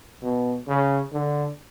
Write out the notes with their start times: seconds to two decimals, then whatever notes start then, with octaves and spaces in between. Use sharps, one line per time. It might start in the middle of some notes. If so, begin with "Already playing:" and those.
0.22 B2
0.67 C#3
1.12 D3